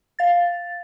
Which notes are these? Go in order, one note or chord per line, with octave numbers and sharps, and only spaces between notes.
F5 A6